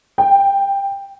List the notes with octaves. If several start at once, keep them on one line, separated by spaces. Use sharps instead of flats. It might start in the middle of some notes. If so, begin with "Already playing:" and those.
G5